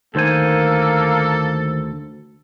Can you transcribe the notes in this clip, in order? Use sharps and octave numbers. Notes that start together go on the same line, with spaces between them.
D2 D#3 A#3 A4 C5 G#5